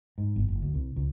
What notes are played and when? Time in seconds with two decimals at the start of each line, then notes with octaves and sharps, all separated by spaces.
0.18 G#2
0.36 G1
0.48 F#1
0.62 D2
0.74 C2
0.96 C#2